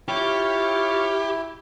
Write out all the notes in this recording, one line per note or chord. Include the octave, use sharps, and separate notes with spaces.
E4 F4 G4 C#5